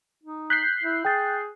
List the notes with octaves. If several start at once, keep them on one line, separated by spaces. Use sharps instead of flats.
D#4
F#6 G6 B6 C7
E4
G#4 G5 A6